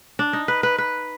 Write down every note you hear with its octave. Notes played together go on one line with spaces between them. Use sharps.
D4
D#4
B4
B4
B4